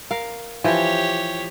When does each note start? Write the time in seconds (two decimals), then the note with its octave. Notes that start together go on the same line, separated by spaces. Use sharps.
0.11 A#4 F5
0.64 E3 F3 G4 C#5